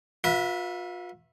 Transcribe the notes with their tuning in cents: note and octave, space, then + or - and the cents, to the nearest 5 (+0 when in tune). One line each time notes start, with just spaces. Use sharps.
F4 +40 B4 -30 E5 +5